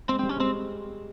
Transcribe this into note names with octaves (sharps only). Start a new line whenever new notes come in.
G#3 C4
G3 C4
C#4
G#3 C4